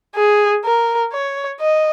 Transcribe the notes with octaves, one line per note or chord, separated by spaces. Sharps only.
G#4
A#4
C#5
D#5